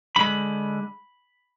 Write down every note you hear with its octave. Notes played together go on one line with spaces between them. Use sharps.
G2 D3 G#3 B5